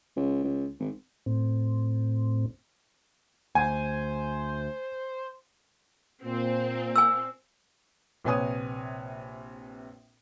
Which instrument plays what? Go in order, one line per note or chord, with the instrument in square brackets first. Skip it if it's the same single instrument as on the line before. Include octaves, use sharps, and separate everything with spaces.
[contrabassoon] C#2
C#2
G#1
[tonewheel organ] A2 C4
[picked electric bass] D2 [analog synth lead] C5 [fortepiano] G#5
[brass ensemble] A#2 [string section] C4
[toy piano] G#5 E6
[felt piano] A#1 C3 B4 C#5 G#5 D#6